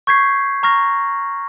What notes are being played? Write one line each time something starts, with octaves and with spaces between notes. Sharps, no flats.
C#6 G6 G#6 B6 C7
A#5 C#6 F6 A#6 F7